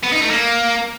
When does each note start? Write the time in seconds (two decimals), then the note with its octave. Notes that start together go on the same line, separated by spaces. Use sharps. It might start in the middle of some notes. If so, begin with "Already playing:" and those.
0.04 B3
0.13 D#4
0.21 A3
0.30 A#3